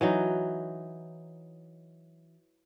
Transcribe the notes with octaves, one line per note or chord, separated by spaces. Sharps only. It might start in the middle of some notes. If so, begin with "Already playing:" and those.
E3 F#3 D#4